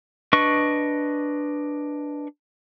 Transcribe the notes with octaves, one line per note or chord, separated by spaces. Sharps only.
D4 B4 D#5 C#6